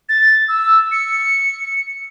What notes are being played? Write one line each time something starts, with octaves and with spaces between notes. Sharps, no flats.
A6
E6
C#7